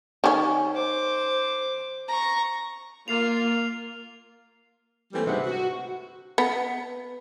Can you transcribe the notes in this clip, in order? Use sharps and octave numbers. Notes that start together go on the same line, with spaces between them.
D#3 C#4
C5 D6
A#5 C#6
A#3 F4 F6 C7 F7
E3 G3 A3 A#3 C4
D2 G#2 C3 B4 F#5
F#4
B3